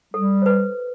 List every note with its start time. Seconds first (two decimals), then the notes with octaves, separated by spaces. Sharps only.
0.14 G3 A4
0.42 B4 C5